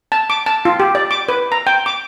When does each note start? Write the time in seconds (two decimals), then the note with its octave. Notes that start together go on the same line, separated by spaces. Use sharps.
0.12 A5
0.30 D6
0.46 A5
0.65 F4
0.80 G4
0.95 D5
1.11 D6
1.29 B4
1.52 A#5
1.67 G5
1.86 D6